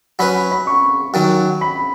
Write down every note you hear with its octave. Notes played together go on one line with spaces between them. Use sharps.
F#3 C#4 B4 B5
B5
C#6
F#2 D#3 F#3
B5